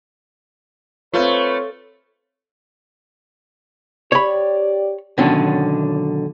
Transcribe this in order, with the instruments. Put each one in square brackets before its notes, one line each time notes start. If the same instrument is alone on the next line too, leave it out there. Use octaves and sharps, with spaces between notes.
[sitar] A3 [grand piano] C4 F4 [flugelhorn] B4 [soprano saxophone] C#5
[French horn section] G4 D5 [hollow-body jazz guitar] C#5 B5
[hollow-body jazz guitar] B2 D3 D#3 F#3 C#4 D4